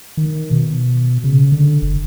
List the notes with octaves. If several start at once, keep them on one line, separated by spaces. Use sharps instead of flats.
D#3
B2
C#3
D3
F#1